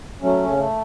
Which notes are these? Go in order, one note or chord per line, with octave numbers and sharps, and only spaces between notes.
F#3 A3 C#4
C#3
A3